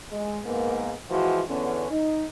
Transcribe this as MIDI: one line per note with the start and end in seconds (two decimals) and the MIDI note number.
0.11 0.38 56
0.44 0.92 44
0.44 0.92 58
0.44 0.92 59
1.10 1.42 52
1.10 1.42 53
1.10 1.42 56
1.10 1.42 66
1.48 1.89 40
1.48 1.89 50
1.48 1.89 59
1.48 1.89 61
1.91 2.25 63